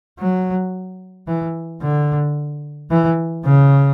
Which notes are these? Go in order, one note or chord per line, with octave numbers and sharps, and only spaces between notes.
F#3
E3
D3
E3
C#3